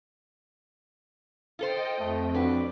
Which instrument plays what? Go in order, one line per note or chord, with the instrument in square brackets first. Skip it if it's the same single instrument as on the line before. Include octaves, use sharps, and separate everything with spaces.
[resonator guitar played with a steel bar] F4 A4 C5 [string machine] D#5 G5
[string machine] F2 [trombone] A3
[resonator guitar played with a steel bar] D4 B4 [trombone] F#4